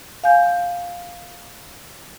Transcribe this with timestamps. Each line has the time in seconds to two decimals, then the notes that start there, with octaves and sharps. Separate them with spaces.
0.24 F5 G#5 G6